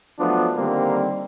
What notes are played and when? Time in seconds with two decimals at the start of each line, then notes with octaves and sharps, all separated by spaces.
0.19 F3 F#3 A3 B3 D4 F4
0.56 D3 D#3 G3 A#3 C4